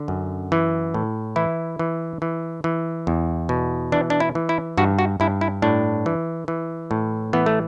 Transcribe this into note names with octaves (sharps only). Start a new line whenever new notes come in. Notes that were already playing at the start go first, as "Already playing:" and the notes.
Already playing: D3
F#2
E3
A2
E3 E4
E3
E3
E3
E2
B2
E3 D4
D4
E4
E3
E4
G2 F#4
F#4
G2 E4
E4
A2 D4
E3
E3
A2
E3 B3
A3